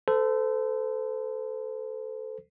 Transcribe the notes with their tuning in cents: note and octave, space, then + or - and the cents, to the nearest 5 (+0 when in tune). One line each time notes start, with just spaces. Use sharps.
A4 +0 C5 -35